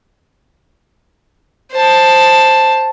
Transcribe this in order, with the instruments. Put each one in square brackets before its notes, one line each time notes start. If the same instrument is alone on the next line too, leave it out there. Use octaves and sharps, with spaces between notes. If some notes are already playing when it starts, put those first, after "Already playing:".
[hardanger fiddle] C5 A5